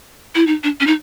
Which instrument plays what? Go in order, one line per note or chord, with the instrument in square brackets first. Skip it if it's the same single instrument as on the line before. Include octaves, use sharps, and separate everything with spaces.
[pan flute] E4
D#4
D4
C#4
D#4